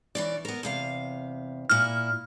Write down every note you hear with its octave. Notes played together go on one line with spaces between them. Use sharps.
E3 C#4 D5
B3 A#4
E2 C3 F5
A#2 E4 F6